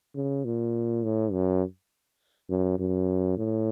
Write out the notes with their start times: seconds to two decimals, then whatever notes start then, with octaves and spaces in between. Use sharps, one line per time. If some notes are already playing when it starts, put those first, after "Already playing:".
0.16 C#3
0.45 A#2
1.04 A2
1.32 F#2
2.50 F#2
2.79 F#2
3.38 A2